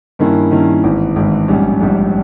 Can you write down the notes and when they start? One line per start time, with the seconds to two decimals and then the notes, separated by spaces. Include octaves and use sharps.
0.19 G2 D#3 A#3 C#4 E4
0.51 G2 D#3 A#3 C#4 E4
0.84 G#1 G#2 E3
1.16 G#1 G#2 E3
1.48 A#1 G#2 G3 C#4
1.81 A#1 G#2 G3 C#4